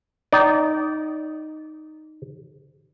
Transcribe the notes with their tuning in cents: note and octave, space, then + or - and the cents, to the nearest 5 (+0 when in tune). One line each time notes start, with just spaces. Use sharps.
D#4 -5 D5 -20 G5 -35